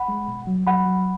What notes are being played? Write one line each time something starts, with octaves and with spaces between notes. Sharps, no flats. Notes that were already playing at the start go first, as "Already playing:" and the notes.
Already playing: F#5 B5
G#3
B2
F#3
F#3 F#5 B5
F#3